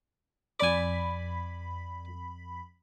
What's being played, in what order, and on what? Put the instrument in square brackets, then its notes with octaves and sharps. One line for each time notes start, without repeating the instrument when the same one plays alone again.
[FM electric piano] F2 B5 B6 [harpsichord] D5 G#5